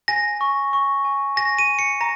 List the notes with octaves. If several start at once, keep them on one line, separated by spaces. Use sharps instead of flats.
G#5 A#6
C#6
C#6
G#5
G#5 A#6
D#7
G#5
C#7
A#5 A#6